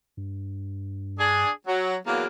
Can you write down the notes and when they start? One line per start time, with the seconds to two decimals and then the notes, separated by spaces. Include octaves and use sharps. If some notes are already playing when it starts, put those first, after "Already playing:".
0.17 G2
1.19 D4 G#4
1.67 F#3
2.06 E2 F#3 A#3